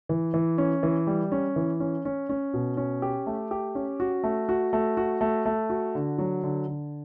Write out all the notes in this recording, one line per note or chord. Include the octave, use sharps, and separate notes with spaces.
E3
E3
C#4
E3
G3
C#4
E3
C#4
C#4
C#4
B2
C#4
G4
A3
G4
C#4
F#4
A3
F#4
A3
F#4
A3
A3
F#4
D3
F#3
D3
D3